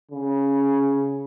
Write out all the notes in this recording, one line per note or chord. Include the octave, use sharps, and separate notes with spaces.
C#3